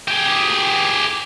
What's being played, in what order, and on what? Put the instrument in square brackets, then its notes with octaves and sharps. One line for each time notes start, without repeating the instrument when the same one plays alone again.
[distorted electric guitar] G4 G#4